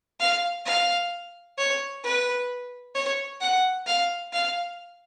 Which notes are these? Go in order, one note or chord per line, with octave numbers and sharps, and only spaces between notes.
F5
F5
C#5
B4
C#5
F#5
F5
F5